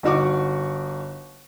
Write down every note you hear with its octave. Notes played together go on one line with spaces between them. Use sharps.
G1 D#4 F#4 C#6 D6